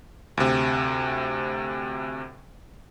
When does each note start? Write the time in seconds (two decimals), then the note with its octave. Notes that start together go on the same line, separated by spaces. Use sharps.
0.37 D2 C3